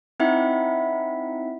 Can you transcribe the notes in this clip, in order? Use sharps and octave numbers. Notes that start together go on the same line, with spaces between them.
C4 D#4 E4 E5 F#5